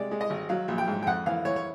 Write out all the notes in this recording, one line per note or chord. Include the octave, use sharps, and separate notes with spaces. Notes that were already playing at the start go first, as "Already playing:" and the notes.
Already playing: C3 G#3 D5
G#3
D#5
G#1
F#3 F5
A#1
G5
G#2
G5
F2 F#5
E3 F5
E3 C#5
C#5